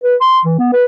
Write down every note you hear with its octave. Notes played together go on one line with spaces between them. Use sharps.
B4
C6
E3
B3
B4